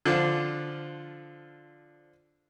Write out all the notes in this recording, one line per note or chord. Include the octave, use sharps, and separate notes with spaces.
D3 F3 C4 D4 F4